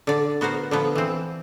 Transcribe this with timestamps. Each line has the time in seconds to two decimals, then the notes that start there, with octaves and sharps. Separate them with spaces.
0.07 D3 D5
0.41 B3 F#4 A#4 C5
0.71 D3 F3 B3
0.95 E3 C4